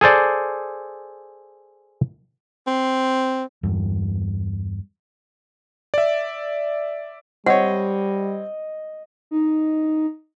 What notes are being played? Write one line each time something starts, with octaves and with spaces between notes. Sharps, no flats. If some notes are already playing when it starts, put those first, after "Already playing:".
G#4 A4 C5 D5
C4
E2 G2
D5 E5
G3 C4 C#5 D#5 F#5
D#4